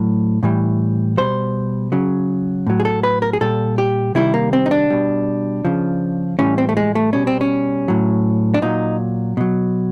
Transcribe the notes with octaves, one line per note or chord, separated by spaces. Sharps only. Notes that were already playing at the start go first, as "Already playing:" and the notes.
Already playing: A2 F#3
A2 E3 G3
B2 G3 C5
C#3 F#3
A2 F#3
G#4
A4
B4
A#4
G#4
A#2 G3 A4
G4
C3 D#3 G3 E4
A#3
C4
D#4
D4
B2 G3
C#3 F3
A2 E3 G3 C#4
C4
A3
G#3
A3
B2 G3 C#4
C4
C#4
A2 F#3
D4
A#2 F#3 D#4
B2 F#3